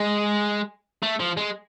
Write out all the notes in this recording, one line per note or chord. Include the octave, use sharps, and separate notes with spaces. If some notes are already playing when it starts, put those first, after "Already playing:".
Already playing: G#3
A3
F3
G#3